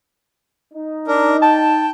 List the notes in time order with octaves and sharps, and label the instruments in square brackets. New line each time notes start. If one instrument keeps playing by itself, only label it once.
[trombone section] D#4
[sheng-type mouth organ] D4 A#4
[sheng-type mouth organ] G5 [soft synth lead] A5